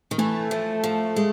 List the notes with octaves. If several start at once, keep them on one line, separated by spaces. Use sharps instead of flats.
D#3
E3 A3
F3
F3
G#3